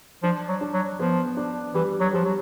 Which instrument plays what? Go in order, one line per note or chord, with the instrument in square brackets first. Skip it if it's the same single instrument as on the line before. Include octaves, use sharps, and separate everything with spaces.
[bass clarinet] F3 [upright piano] D4
[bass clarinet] F#3
[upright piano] D4
[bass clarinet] F#3
[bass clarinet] F3 [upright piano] B3
[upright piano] D4
[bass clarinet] E3 [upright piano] G3
[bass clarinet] F#3
[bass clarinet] F3 [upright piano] G3
[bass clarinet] F#3